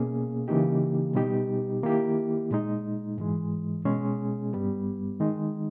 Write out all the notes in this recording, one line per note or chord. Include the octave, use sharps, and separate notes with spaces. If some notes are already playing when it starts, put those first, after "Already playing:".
Already playing: B2 A#3 C#4 G#4
C#3 E3 A#3 D#4 G4
B2 G3 B3 D#4 G4
D#3 A#3 E4 G4
A#2 G#3 D#4
G#2 E3 G#3
B2 G#3 C#4 G#4
G2 G3 B3
D#3 G#3 D#4